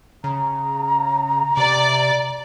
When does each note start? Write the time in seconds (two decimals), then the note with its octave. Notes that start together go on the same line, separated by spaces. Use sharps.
0.24 C#3 A#5
1.57 C3 D5